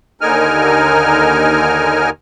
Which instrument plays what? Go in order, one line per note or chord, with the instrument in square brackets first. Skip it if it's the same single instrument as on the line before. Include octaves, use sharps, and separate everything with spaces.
[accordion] D#2 D3 D#4 A#4 G#5 F6